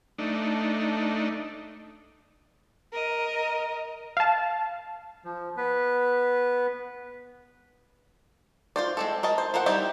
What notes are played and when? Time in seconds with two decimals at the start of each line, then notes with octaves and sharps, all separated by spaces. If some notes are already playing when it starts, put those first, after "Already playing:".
0.18 A3 D4 D#4
2.92 A#4 D#5
4.17 F5 A5
5.25 F3
5.57 B3 B4
8.76 F4 C5 D5
8.97 G#3 C4 A4
9.23 A#4 D#5 A5
9.38 C5
9.54 F3 A#4 C5 F#5
9.66 G3 C4 D#4 E4 G4